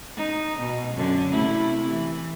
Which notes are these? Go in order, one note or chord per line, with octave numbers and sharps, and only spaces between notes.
D#4
B2
F#2 D3
C3 A3 E4
E3